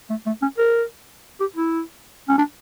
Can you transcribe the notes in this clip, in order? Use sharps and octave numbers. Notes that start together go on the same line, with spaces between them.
A3
A3
C#4
A#4
G4
E4
C#4
D4